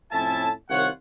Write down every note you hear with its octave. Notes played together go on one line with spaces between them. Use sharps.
F2 A2 C#4 E4 E5 A5
C2 D#3 F4 C#5 F#5